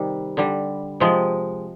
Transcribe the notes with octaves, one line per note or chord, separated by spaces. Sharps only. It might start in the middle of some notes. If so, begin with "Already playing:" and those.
Already playing: C3 D#3 G3
D3 G3
C3 F3 G#3